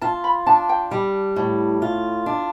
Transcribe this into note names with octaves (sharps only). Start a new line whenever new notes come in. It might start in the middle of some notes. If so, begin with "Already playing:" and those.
F4 A5
B5
D4 A5
G5
G3
A2
F4
D4